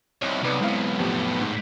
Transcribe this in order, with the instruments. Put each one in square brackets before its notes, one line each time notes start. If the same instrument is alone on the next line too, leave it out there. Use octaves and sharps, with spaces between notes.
[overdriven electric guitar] C2 [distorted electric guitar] D#4 C#5
[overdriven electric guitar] B1 [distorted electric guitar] C3 D5 [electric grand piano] D#4 B4 C#7
[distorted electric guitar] G#2 B3 [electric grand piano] C4 E4 F5
[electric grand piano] F2 F3 G4 [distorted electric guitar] A2 B3
[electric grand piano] G#2